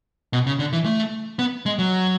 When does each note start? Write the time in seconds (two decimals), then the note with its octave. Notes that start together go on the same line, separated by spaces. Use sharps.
0.33 B2
0.47 C#3
0.59 D3
0.73 E3
0.85 A3
1.39 B3
1.66 G#3
1.79 F#3